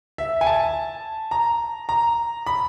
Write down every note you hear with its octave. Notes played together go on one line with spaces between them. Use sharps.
E5
G#5
A5
A#5
A#5
B5